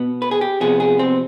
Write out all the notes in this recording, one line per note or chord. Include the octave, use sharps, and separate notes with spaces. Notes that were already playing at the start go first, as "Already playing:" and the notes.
Already playing: B2 B3
B4
G#4
G4
C3 F3 B3 G#4
G#4
C4